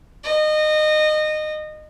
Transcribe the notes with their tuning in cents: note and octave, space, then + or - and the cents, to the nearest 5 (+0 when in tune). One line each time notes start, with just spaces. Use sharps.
D#5 -25